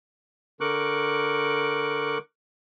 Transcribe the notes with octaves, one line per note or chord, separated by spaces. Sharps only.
D3 A#4 C#6 D6 F#6